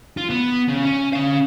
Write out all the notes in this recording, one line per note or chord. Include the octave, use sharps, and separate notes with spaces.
F4
B3
C#3
C#4
C#4 F5